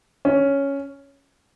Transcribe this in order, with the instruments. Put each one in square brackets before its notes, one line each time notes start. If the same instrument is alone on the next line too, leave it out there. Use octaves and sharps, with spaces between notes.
[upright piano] C#4